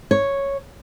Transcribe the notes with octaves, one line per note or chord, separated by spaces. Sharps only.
C#5